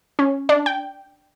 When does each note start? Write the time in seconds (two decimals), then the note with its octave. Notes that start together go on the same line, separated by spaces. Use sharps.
0.19 C#4
0.49 D4
0.66 G5